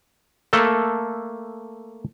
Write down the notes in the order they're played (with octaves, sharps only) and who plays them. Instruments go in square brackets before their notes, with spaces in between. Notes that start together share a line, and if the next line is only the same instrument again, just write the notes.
[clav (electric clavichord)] A3 A#3 A4